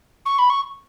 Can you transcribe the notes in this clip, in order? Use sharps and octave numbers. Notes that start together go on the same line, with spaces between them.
C#6
B5
C#6